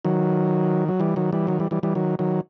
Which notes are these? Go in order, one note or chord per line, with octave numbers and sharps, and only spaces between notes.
D#3 F#3
F#3
E3 G3
D#3 F#3
E3 G3
D#3 F#3
E3 G3
E3 G3
E3 G3
D#3 F#3
D#3 F#3